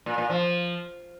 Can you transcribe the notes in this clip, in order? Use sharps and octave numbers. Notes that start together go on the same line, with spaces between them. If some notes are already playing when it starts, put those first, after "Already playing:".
A#2
A#2
F3